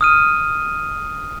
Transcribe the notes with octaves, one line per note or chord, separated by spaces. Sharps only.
D#6 F6 D#7